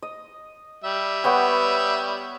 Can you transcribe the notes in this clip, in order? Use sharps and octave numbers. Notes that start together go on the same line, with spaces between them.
D#5
G3 E5
B3 C#5 G5